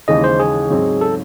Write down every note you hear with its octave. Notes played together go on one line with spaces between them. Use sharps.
D#2 C#3 E3 G#3 D#4 D#5
C5
G#4
G#2 F#3 C4
A4